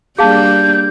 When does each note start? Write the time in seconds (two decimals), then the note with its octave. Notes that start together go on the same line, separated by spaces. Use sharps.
0.19 G3 A#3 D4 G#4 F5 A5 G6